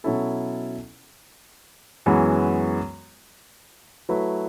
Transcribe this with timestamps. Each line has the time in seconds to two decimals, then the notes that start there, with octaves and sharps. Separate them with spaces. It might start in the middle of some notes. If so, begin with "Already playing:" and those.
0.04 B2 F#3 C#4 E4 A4
2.06 F#2 E3 G#3 B3 F#4
4.09 F#3 A3 E4 B4